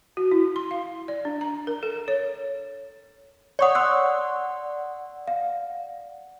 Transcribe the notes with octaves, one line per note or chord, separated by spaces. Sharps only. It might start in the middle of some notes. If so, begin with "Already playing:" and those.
F#4
E4
C6
F5
D5
D4
A#5
A#4
A4
C#5
C#5 D5 F#5 C#6 D#6
C6 E6 F#6
F5